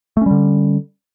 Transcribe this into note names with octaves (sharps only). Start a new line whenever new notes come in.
D3 G3 A3 C#4